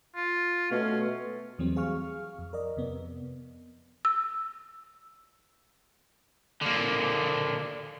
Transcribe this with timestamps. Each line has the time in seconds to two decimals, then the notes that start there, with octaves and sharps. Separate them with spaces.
0.16 F4
0.71 B2 A3 C#4
1.59 E2 E3 F#3 G3 A3 C4
1.76 G#4 F5 C#6 F6
2.39 F2
2.53 A#4 D5 D#5
2.77 F2 C3 B3
4.05 E6
6.62 D3 A#3